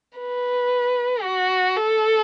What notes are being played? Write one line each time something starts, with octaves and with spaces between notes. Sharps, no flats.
B4
F#4
A4